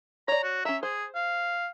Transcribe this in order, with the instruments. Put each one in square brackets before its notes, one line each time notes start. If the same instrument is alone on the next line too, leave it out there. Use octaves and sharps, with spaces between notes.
[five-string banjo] C#5 D5 [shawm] A#5
[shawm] F#4
[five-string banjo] C#4 A#5 [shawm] E5
[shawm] G#4 [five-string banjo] C5
[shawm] F5